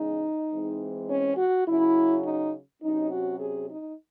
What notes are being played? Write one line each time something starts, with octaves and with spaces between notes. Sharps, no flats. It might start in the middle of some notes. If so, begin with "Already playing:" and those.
Already playing: E2 C#3 G#3 D#4
G#2 E3 G#3 C4
C#4
F#4
C#3 F#3 C#4 E4
D#4
C3 F#3 C#4 D#4
F#4
G#4
D#4